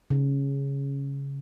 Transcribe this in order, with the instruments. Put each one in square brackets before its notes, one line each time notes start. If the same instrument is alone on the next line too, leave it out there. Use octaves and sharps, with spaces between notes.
[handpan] C#3